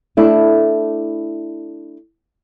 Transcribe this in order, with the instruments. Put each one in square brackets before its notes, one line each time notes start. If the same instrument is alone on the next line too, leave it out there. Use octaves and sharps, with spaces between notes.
[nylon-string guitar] A3 D4 E4